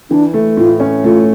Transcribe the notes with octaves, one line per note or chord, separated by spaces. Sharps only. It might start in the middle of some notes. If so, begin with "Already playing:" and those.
E3 D4
A3
A2 F4
C#4
A3 F4